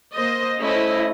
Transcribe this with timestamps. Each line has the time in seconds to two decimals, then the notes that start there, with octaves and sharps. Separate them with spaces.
0.15 A#3 C5 D#5
0.61 A3 C#4 E4 C5 D#5